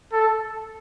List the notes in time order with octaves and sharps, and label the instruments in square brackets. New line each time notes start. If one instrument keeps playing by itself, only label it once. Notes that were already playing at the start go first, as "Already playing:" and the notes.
[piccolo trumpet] A4